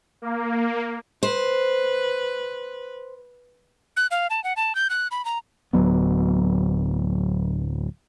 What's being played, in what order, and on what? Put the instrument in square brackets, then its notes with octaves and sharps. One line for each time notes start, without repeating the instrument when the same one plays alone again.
[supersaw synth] A#3
[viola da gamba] B4 [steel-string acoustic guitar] C5
[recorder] F#6
F5
A5
F#5
A5
G6
F#6
B5
A#5
[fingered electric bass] D1 G1 F#3 B3